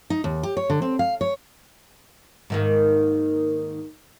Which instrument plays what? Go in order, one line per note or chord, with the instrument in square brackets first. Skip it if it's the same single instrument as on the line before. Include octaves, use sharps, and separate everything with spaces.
[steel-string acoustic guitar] D#4
D#2
G4
C#5
D3
C4
F5
C#5
[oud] G#2 D#3 A#3